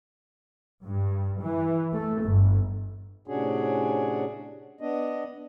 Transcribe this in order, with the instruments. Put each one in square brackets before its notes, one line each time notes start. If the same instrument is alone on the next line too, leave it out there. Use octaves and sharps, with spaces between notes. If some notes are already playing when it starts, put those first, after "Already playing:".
[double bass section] G2
E3
A3
G1
[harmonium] A2 C3 C#4 D4 F#4 G#4
B3 D4 D#5